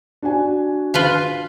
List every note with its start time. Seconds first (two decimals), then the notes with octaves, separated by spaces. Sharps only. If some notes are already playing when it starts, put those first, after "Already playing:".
0.22 D4 F#4 G#5
0.94 F4 B4 F5